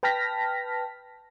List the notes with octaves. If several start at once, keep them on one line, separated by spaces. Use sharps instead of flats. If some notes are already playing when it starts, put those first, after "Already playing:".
B4 G5 A5 F6 A#6 B6